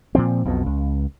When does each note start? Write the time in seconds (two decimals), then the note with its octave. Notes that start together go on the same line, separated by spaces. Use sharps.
0.15 A#2 F3 C4
0.45 B1 F2 B2
0.66 C#2